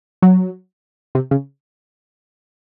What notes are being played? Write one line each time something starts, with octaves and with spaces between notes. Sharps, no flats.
F#3
C3
C#3